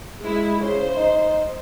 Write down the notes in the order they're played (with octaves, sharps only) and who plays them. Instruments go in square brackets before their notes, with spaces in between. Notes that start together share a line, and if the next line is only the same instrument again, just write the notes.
[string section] G#3 E4
[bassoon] C#3 [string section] C5
[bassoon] D#4